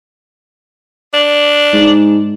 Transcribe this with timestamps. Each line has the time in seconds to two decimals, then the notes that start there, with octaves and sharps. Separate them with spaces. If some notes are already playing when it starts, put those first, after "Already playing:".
1.13 D4
1.73 G#2